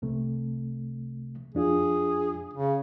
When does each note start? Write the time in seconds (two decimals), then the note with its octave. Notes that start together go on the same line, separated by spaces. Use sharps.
0.02 C2 C3 A3
1.55 F2 D4 F4 G#4
2.54 C#3